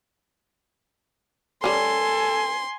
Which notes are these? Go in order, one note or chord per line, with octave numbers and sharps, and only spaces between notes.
G3 C#4 A4 G#5 C6